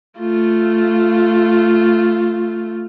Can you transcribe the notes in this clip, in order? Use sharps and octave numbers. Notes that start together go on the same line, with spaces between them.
A3 F4